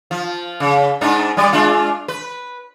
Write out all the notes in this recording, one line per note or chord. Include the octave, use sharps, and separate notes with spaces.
F3
C#3
G#2 D4 D#4
G3 D5
G#3 D4 F4
B4